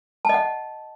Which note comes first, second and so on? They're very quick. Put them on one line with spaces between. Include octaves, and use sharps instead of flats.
A5 D#5 F#5